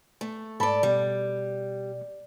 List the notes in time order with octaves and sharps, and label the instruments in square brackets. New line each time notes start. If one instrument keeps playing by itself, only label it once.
[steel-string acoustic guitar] A3
[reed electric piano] G#2 A5 B5 [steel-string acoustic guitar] A4 D5
[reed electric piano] B2 [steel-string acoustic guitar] G3